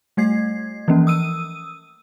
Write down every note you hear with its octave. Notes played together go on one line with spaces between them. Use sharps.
G3 A3 G#6 C7
E3 F3 A#3 C#4
D#6 E6 D#7